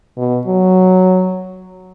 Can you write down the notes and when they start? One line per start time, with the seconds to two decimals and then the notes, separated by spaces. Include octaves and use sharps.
0.17 B2
0.47 F#3